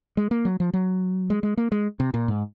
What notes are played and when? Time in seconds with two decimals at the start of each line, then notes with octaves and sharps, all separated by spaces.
0.17 G#3
0.31 A#3
0.45 F#3
0.60 F3
0.73 F#3
1.30 G#3
1.43 G#3
1.57 A#3
1.72 G#3
2.00 C3
2.14 A#2
2.28 G#2